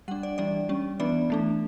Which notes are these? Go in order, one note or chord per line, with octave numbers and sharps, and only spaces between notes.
G3 D4 F#5
D5
E3 G3 D4 D5
G3 C#4
E3 B3 D4 D5
E3 A3 D4